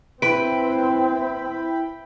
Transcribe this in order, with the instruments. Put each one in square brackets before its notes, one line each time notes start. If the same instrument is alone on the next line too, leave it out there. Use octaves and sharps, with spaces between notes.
[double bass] C4 [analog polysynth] E4 G5 B5 [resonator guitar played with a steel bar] B4 [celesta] D7